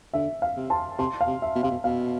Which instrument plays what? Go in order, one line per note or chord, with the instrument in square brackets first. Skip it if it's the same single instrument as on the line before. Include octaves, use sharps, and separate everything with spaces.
[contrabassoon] D3 [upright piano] E5
[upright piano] F5
[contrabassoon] C3
[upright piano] A5 C6
[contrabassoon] C3 [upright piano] A5 C6
[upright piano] F5
[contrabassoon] C3
[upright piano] E5
[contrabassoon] B2
[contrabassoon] C3 [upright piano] F5
[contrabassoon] B2
[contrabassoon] B2 [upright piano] F5